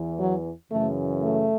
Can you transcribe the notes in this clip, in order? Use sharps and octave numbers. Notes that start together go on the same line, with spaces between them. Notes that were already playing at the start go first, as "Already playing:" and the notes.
Already playing: E2 E3
F#3
F#2 C#3 E3 A3
A3